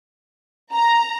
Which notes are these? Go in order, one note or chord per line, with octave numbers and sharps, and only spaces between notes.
A#5